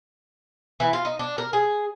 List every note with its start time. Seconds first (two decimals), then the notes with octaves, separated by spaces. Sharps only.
0.80 E3
0.93 F4
1.05 D#4
1.19 D4
1.38 A#4
1.53 G#4